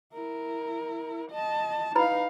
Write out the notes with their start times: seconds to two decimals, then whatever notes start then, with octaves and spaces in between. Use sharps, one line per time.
0.13 E4 A#4
1.31 D#5 A5
1.95 D#4 E4 B4 F5 B5